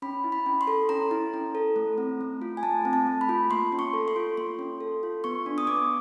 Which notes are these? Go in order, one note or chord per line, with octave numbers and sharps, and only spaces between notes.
C#4 B5
E4
B5
C#4
C6
A4
C#4 A#5
E4
C#4
A4
A3
C4
A3
F4
G#5
A3 A5
C4
A5
A3
B5
F4
A#3 C6
C#4
C#6
A4
C6
F4
A#3 C6
C#4
A4
F4
B3 C#6
D4
D#6
B3 D6